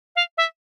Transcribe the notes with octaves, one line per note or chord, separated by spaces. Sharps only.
F5
E5